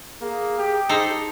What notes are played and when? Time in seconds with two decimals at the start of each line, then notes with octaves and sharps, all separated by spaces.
0.21 A#3 G#4
0.58 G4
0.89 D#4 A4 C5